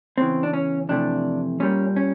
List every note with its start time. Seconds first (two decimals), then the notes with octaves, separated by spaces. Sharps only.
0.18 E2 C#3 E3 C4
0.43 D4
0.53 C#4
0.89 F2 C3 E3 A3 D4
1.60 A#2 G3 A#3 C#4
1.96 C#4